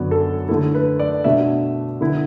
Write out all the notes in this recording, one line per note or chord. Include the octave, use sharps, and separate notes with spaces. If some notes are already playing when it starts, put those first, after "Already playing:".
Already playing: F#2 D3 F#3 B3 D5
A4
D3 A3 E4 A4
B4
D5
B2 A3 D4 E5
D3 B3 E4